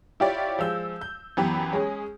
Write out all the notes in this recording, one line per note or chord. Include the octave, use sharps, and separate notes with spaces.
E4 F4 G4 C#5 D5
F3 G#3 E6 G6
G6
F#2 E3 B3 G4 B5
G#3 C#4 G#4